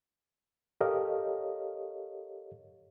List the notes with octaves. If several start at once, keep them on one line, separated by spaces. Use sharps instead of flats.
G4 A4 A#4 C#5 D#5 F5